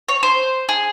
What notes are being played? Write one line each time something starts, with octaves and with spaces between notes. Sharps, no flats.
C#5
C5
G#4